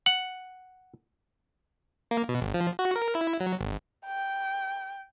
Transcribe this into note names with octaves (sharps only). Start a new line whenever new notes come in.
F#5
A#3
B2
G#1
F3
F#4
A#4
E4
F#3
G#1
G5